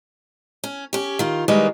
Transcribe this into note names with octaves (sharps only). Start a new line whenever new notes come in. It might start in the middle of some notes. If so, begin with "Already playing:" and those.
C#4
C#4 G4
D#3 F4
D#3 G3 G#3 A#3 B4